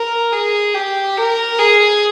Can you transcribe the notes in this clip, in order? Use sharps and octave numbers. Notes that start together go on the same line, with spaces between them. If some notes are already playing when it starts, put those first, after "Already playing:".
Already playing: A#4
G#4
G4
A#4
G#4